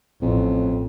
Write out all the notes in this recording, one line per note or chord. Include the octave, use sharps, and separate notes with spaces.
A1 F2